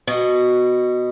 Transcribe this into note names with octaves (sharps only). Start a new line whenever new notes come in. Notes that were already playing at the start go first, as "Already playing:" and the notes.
B2 F#4